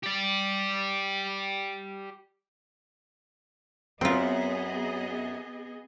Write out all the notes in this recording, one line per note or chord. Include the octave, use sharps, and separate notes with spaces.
G4 D5
F#2 B3 C4 F4 G#4 D#5